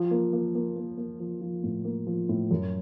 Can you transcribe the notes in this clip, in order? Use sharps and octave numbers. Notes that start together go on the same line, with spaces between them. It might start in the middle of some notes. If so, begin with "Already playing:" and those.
Already playing: F3
A#3
A#3
A#3
A#3
A#3
F3
F3
A2
A#3
F3
A2
F#2